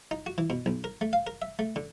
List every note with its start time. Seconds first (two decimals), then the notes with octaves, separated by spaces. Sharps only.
0.11 D#4
0.26 F#4
0.38 E3
0.50 B2
0.66 B1
0.84 A#4
1.01 A3
1.13 F5
1.27 A#4
1.42 E5
1.59 A3
1.76 D3